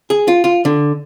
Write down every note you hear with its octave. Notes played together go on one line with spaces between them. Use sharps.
G#4
F4
F4
D3